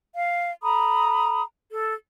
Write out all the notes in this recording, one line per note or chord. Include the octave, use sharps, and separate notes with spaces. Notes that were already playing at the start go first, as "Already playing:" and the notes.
F5
A4 A#5 B5 D#6
A4